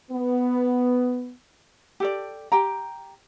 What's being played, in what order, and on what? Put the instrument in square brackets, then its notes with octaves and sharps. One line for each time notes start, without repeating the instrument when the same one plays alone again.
[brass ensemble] B3
[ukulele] G4 A4 D5
G4 G5 A#5